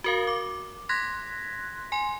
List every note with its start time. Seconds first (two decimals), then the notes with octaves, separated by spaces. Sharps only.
0.04 F#4 A#4 F5
0.27 D6
0.89 C6 F#6 G#6 A#6 B6
1.92 G#5 C6